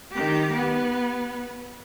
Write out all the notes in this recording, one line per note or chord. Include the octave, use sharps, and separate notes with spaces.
D#3 G4
B3